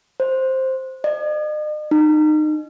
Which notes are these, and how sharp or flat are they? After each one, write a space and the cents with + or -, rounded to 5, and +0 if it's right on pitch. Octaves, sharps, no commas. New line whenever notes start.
C5 +5
D#5 -45
D#4 -25